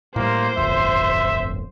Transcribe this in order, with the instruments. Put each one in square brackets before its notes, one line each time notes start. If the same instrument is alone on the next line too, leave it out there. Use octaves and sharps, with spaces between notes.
[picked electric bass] A2 G3 [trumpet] A#3 [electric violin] C5
[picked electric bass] D1 G1 F2 [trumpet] E5